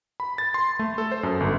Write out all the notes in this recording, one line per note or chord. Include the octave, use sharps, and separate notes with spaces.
B5
A6
C6
A3
A4
C5
F#2
G1